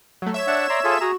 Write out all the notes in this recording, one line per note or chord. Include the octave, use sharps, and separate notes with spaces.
F#3 A3
C#5 E5 E7
D4 F#5 A5
D5 A#5 C6
F4 G#4 A4
F#4 G#4 A#5